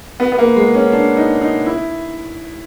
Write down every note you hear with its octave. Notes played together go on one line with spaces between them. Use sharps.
B3
B3
A#3
G#3
C#4
D4
D#4
D#4
E4